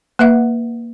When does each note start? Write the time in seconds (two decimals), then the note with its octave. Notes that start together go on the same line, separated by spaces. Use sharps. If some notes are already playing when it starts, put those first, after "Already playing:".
0.19 A#3 B4 E5 F#5